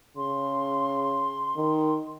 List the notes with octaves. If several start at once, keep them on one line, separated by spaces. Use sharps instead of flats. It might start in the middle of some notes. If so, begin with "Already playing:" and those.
C#3 C6
D#3